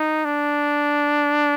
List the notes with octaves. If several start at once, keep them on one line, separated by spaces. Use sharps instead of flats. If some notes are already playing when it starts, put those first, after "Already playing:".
Already playing: D#4
D4